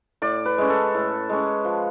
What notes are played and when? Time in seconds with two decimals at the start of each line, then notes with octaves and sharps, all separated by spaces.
0.22 A2 D5
0.45 B4
0.58 G#3 C#4
0.69 A4
0.94 A2
1.29 G#3 C#4
1.65 F3